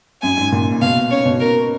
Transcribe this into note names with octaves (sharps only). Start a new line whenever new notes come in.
F#2 G#5
G#2
A#2
C#3
B2 F5
C#3 C#5
B2
A#4